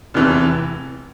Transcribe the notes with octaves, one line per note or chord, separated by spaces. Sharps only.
F1 E2 C3 E3